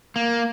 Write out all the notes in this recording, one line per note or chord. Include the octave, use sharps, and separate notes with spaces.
A#3